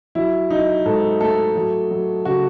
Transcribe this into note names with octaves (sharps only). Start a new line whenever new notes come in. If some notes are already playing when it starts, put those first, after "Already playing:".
F#3 E4
F#3 D#4
G#2 A4
A3 A4
F#3
F#3
C#3 F#4